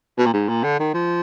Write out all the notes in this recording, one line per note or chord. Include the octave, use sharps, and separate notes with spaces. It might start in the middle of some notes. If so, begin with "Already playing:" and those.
B2
A#2
G#2
A#2
D3
D#3
F3